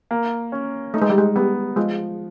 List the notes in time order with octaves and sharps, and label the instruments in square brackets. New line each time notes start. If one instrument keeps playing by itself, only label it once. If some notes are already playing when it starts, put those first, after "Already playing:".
[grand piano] A#3
C#4
[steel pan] A3 [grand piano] D#4
[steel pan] G#3
G3
G#3
[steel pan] G3 [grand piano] B3
[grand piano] F3 [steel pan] G#3